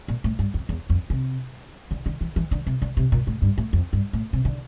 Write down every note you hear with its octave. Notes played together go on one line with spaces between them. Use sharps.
A#2
A2
G2
F2
E2
F2
C3
D3
D3
E3
E3
D3
C3
D3
C3
A#2
A2
G2
A2
F2
G2
A2
C3
D3